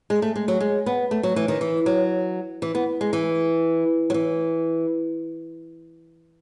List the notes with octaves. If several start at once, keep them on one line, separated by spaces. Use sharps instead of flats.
G#3
A3
G#3
F#3
G#3
B3
A3
F#3
E3
D#3
E3
F#3
E3
B3
G#3
E3
F#3
E3